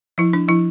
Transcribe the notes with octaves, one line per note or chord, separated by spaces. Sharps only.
F3 E4
D4
F3 E4